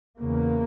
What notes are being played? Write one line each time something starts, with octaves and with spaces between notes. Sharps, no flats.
E2 C#3 A#3